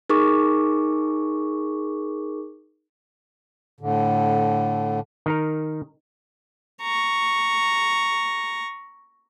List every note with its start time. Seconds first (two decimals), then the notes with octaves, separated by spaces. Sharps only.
0.10 D#4 G#4 A#4 C#6 D6
3.80 A2 D3
5.26 D#3 D#4 A#4
6.82 A#5 C#6